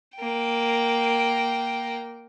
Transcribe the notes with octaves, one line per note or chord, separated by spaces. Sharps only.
A#3 G5